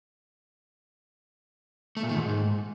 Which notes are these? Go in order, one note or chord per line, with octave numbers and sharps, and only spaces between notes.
A3
A#2
D#3
G#2